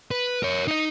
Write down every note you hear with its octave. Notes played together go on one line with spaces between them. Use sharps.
B4
A#4 C#5
D#4 D#5